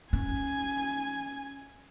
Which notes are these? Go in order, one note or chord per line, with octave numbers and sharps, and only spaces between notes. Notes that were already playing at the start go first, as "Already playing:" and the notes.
C#4 G#5